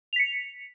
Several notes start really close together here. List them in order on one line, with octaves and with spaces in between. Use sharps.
F7 B6 C#7